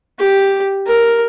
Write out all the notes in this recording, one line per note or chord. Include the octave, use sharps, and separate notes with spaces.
G4
A#4